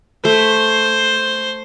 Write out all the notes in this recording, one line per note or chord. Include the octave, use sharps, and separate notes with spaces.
A3 C5